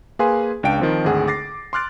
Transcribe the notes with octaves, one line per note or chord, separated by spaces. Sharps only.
A#3 G#4 B4 F5 G#5 C6
C#2 D4 F5 G5 D7
D#3 F3 C4
G#1 D2 G#4 F#5
D6 A6 A#6 C7
C6 D6 F6 F#6 A6 D7